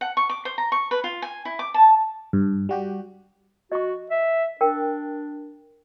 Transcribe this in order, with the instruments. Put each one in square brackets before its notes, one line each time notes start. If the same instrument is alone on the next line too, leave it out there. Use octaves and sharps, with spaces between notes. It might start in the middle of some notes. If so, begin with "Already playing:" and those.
[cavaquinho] F#5
C#6
D6
C5
A#5
C#6
B4
F4
G#5
E4
D6
A5
[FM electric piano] G2
G3 F#4 G4
[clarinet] F#4 [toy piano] D#5 C#6
[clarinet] E5
[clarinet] D4 [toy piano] A#4 G5